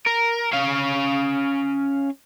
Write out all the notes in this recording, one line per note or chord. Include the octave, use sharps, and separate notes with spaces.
A#4
C#4 F5